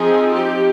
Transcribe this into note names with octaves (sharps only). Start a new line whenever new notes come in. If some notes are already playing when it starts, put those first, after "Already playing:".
Already playing: F3 C4 D#4 G#4
G4